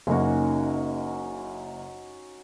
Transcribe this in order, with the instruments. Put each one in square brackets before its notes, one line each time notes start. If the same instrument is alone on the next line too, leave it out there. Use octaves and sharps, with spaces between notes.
[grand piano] F#1 A#3 [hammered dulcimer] C#4 D#4 F#4